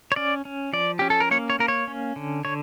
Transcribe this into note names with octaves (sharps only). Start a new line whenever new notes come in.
C#5
C#4 D5
C#4
F3 D5
C#4 G4
A4
A#4
A#3 C#5
C#5
A#3 A#4
C#5
C#4
D3
D3 C#5